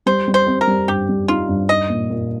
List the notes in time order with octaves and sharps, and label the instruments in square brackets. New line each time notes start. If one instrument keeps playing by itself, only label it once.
[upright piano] G3 [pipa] C5
[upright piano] G3
[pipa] C5
[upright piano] C4
[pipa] A#4
[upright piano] G3
[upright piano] G2 [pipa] G4
[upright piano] G3
[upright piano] D#4 [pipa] F4
[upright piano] G2
[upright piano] D#4 [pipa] D#5
[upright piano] A#2
A#2